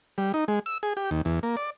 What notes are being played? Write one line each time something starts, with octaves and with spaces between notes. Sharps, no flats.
G3
D#4
G#3
E6
G#4
G4
D#2
E2
A#3
D5